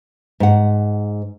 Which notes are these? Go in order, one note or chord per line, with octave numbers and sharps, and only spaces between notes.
G#2 F#5